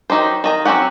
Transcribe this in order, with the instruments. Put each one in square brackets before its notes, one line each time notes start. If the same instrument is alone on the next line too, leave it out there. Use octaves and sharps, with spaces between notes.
[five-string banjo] D#3 F#3 D#4 G4 C5
D#3 D#5 A#5
F#3 C4 C#4 G4 F#5